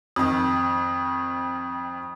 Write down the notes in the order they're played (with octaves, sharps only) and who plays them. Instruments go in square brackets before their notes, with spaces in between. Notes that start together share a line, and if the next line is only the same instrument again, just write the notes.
[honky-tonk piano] F2 D#3 [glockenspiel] D#6